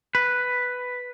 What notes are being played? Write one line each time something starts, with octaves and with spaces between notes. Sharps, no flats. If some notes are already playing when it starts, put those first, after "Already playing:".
B4